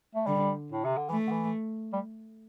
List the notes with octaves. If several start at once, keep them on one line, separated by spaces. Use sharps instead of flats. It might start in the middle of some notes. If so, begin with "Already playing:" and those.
A3
D3 G3
A2
C3
D3
E3 A3
D3
E3
G3